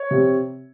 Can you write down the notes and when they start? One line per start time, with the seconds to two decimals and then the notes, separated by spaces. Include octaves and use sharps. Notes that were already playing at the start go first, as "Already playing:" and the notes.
Already playing: C#5
0.11 C3